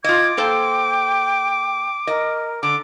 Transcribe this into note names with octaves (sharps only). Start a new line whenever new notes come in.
F4 D#5 D6 G#6
A#3 A4 C5 G5
A#4 D#5
D3 D6